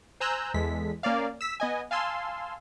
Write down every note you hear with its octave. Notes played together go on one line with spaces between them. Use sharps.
C5 G#5 A#5 E6 F#6 G6
E2 G#3 A4 B6
A#3 C#4 D5 F5
E6 B6
B3 D#5 G#5
F5 G#5 A5 C6 E6